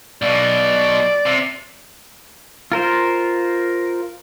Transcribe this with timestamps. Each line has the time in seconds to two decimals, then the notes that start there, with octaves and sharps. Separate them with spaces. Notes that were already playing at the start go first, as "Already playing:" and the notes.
0.22 B1 B2 D5
1.26 C3
2.72 F4 A#4 C5